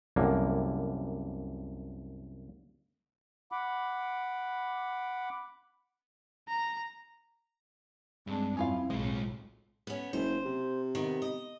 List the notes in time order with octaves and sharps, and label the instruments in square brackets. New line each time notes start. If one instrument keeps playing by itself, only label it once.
[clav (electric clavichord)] C2 F#2 D3 A#3
[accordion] F#5 B5 D6
[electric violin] A#5
[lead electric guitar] G2 [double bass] G#3 D4 [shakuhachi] C4
[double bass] F2 E4 [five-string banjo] C#4 F4 F5
[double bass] B1 A2 [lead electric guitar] G#3 F4 [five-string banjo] C5
[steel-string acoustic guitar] B3 C#4
[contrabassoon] F#1 [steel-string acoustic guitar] C5
[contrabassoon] C3
[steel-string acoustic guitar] D#3 B3
D#5